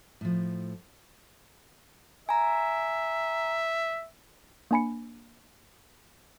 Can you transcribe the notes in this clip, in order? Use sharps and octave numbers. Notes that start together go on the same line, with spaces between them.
A2 F3
E5 G#5 A#5
A#3 D4 G#5 B5 C#7